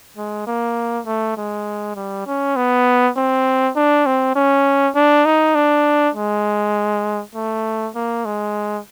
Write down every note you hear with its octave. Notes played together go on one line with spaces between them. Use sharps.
G#3
A#3
A3
G#3
G3
C#4
B3
C4
D4
C4
C#4
D4
D#4
D4
G#3
A3
A#3
G#3